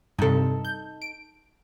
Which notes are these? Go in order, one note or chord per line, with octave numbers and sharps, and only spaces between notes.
G2 C3 D#4 A4
G6
D7